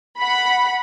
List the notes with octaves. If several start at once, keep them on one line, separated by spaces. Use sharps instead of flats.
F#5 B5